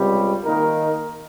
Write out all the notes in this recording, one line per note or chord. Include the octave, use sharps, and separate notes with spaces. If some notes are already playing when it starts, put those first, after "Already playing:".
Already playing: C#2 C3 G3
D#3 A#3 D#4 A#4